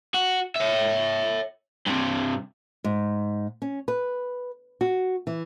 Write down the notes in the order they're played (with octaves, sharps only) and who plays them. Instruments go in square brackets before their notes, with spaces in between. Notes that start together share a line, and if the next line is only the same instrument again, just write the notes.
[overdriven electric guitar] F#4
C#5 E5
G2 C3
[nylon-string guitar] G#2
C#4
B4
F#4
E3